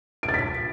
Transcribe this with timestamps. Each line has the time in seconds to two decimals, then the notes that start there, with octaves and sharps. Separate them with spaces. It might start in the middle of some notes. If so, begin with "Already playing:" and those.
0.23 D7
0.29 A6
0.34 B6